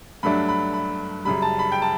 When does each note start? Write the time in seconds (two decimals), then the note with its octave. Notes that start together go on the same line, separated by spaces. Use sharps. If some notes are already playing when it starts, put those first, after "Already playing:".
0.23 G2 F#3 A3 D4 B5
0.49 B5
0.73 B5
1.25 F#2 C#3 G3 B5
1.42 A5
1.59 B5
1.72 G5
1.82 A5